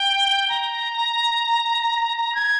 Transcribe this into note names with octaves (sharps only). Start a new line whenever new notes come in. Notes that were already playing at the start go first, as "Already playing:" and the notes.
Already playing: G5
A#5
G#6